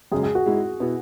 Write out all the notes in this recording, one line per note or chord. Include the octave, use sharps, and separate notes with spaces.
F#2 C#3 G#3 G#4
G#4
F#4
G#2 G#3 E4
B2 B3 E4